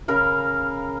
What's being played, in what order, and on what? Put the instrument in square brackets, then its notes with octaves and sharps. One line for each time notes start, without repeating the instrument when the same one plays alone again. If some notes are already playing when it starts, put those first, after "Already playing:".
[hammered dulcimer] C#3 A#4 F5 B5